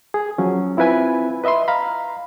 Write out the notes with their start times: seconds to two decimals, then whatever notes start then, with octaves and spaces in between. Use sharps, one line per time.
0.14 G#4
0.38 F3 F#3 C#4
0.77 C4 E4 F4 B4 G#5 B5
1.44 B4 D#5 E5 B5 C6
1.68 F5 A#5 B5